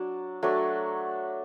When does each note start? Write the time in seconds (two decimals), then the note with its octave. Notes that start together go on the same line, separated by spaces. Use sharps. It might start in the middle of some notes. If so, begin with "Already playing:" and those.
Already playing: F#3 D4
0.43 F#3 A3 D4